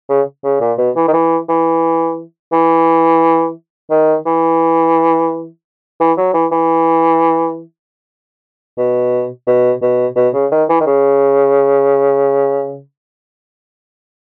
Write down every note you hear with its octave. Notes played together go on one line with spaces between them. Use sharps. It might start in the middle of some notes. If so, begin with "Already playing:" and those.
C#3
C#3
A#2
B2
E3
D#3
E3
E3
E3
D#3
E3
E3
F#3
E3
E3
B2
B2
B2
B2
C#3
D#3
E3
D#3
C#3